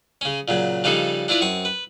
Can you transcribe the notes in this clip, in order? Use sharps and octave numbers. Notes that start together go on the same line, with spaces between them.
C#3 C#4
A#2 C#3 F#3
C#3 F3 G3 D4 D#4 A4
D4 E4 F4 B4 D5
F#2 C4 C#6 D#6
B4